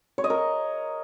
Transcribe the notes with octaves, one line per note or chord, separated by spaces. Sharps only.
C#5
D#5
A#4